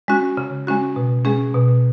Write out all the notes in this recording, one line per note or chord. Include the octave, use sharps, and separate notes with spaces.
G#3 C#4 F#4
C#3
G#3 C#4 F#4
B2
G#3 C#4 G#4
B2